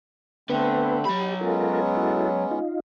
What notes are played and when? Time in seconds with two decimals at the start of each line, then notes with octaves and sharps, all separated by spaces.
0.49 D3 A3 B3 C4 B4
1.05 F#3 G4 B5
1.41 G#3 B3 C#4 F4 A4 A#4
1.97 E4 F#4 A4
2.51 D#4 F4